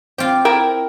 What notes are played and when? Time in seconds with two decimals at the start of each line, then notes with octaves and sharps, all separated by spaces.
0.18 C4 F4 G4
0.45 E4 A#4 G5 A5